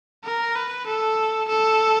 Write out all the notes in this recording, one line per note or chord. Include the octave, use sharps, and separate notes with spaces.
A#4
B4
A4
A4